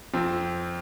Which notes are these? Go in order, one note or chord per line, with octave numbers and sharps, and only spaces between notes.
F2 C4